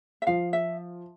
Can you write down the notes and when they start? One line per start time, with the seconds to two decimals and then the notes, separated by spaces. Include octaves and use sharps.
0.22 E5
0.27 F3 F5
0.53 E5